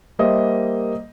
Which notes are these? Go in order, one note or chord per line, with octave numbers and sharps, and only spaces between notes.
G3 A#3 C5 D#5 E5